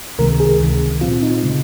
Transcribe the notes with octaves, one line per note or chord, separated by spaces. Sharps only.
C#2 C3 D#3 G#3 A#4
G#4
C#2 C3 D#3
A#2 F3 C4 F4
D#4
C#3 G#3